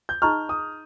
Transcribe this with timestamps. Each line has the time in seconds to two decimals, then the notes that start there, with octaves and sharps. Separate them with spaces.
0.09 G6
0.22 D#4 G#4 D#5 A#5 C#6 F6
0.49 D#6